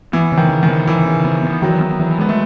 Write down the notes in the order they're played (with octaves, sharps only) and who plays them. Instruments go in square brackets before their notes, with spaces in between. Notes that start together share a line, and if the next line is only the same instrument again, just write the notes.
[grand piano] E3 [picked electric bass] B3
[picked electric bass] C#3
[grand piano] D#3
[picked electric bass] C#3
[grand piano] D#3
[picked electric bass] B3
[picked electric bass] C#3 [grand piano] E3
[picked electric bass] C#3
B3
B3
[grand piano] D#3 F#3 [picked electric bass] E3
[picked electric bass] B3
E3
[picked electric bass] G#3 [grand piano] B3
[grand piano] A3